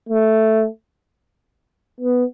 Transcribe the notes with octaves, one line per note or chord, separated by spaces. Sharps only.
A3
B3